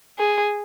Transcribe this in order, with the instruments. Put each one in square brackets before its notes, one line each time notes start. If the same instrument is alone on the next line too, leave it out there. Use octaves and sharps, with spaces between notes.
[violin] G#4